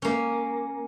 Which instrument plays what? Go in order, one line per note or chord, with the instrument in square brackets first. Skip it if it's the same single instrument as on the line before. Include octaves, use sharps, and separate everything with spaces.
[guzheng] A#3 C#4